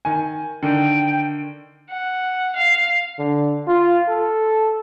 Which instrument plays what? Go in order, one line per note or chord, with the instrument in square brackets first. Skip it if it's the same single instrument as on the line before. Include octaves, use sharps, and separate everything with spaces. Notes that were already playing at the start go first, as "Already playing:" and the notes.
[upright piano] D#3 G#5
[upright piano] D3 D#3 [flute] G5
[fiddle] F#5
F5
[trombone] D3
F4
A4